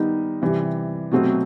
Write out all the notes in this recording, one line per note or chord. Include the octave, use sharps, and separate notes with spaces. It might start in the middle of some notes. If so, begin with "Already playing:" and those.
Already playing: D#3 G3 B3 D#4
C3 E3 G3
B2 F#3 A3 C4